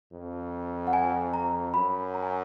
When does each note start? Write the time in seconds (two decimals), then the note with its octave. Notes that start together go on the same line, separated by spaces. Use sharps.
0.12 F2
0.87 F#5
0.93 G#5
1.34 A#5
1.74 F#2 B5
2.14 A#5
2.23 G#5